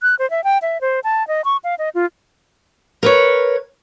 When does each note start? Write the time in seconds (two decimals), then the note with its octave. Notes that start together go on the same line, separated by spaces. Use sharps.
0.02 F#6
0.19 C5
0.30 E5
0.44 G5
0.62 E5
0.81 C5
1.04 A5
1.28 D#5
1.45 C#6
1.64 F5
1.79 D#5
1.95 F4
3.03 A#4 B4 C#5